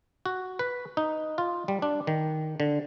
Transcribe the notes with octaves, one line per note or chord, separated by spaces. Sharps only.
F#4
B4
D#4
F4
G3
D4
D#3
D3